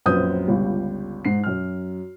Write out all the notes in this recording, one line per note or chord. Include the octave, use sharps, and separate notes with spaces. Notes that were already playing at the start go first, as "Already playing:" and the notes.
A#1 F#2 C4 B4 D#6 G6
G1 C#2 G3
G#2 C7
F#2 F6